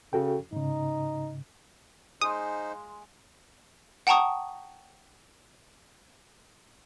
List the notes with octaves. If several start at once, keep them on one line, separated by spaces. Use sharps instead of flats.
C#3 F#4 A4 G5
G#2 C#3 D#4
G#3 D#4 C5 F5 C6 D#6
F#5 G5 A5 A#5 C#6 D#6